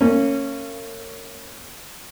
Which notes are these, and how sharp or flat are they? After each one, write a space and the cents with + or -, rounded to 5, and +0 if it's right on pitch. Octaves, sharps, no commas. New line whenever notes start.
A#3 -40 C#4 -10